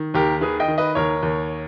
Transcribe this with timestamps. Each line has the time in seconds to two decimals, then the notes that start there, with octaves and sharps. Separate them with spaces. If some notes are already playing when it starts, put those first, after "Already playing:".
Already playing: D#3
0.14 D#2 G4 A#4
0.41 D#3 G#4 B4
0.60 D#5 G5
0.68 D#3
0.78 B4 D#5
0.95 D#2 A#4 C#5
1.23 D#2